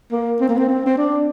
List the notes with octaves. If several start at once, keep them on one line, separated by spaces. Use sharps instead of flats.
A#3
C4
A#3
C4
C4
C4
D4